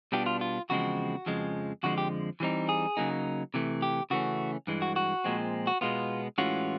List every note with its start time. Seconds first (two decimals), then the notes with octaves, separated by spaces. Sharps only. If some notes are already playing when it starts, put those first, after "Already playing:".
0.12 B2 G3 B3 D4 F4 G4
0.26 F4
0.41 F4
0.70 E2 C#3 F3 G#3 C4 F#4
1.26 F2 C#3 F3 G#3
1.83 F2 D3 F3 G#3 F#4
1.98 G4
2.40 E3 G3 C4 D#4
2.69 G#4
2.97 C#3 F#3 A#3 D#4
3.54 C3 E3 A3
3.82 G4
4.10 C#3 E3 A3 C#4 F#4
4.67 G2 E3 G#3
4.82 F#4
4.96 F#4
5.24 A#2 F3 G#3 C4
5.67 F#4
5.81 B2 G#3 B3 F4
6.38 A2 E3 G#3 C#4 F4 F#4